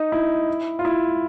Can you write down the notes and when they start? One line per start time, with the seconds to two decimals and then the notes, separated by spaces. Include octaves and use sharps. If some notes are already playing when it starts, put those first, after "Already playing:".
Already playing: D#4
0.12 E4
0.79 F4
0.85 E4